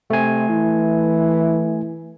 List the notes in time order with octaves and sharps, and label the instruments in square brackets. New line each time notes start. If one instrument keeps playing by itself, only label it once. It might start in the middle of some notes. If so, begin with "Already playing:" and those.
[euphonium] C3 [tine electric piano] A3 G#5
[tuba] E3 [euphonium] E4